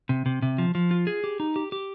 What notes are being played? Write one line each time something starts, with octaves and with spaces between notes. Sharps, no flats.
C3
C3
C3
F3
F3
F4
G#4
G4
D#4
G4
G4